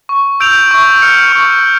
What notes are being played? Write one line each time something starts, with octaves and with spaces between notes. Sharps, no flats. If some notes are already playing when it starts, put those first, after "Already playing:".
C#6
E6 G6 D7 F7
C#6
F6 C#7
C#6
F6